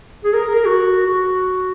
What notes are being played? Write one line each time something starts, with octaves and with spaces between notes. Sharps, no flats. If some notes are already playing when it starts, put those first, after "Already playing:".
G#4
A#4
A#4
A#4
F#4
F#4